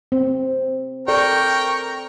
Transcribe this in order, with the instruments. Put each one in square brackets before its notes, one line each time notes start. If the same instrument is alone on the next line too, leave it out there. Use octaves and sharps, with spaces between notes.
[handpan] C4
[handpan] A4 D5 [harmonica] A#4 G5 C#6